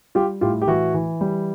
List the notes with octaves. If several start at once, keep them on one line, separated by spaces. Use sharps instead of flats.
G3 F4 G4
A2 F4 G4
G4
E3 E4 F#4
E3
G3